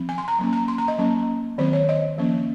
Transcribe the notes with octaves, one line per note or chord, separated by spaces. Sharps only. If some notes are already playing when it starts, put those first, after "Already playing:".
Already playing: F3 C4
G#5
C6
A#5
F#3 A#3 C#4
A#5
C6
A#5
D#5
F#3 A#3 C#4
D#3 F#3 C4 C5
C#5
D#5
F3 A#3 C#4